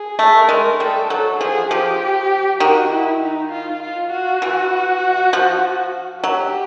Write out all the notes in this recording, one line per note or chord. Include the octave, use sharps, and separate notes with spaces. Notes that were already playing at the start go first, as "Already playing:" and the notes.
Already playing: G#4
A3
A#4
G#3
G3 A4
F#3 A4
F3 G#4
F3 G4
D#3 F#4
E4
D#4
F4
F4
F#4
E3
F3
F#3 G4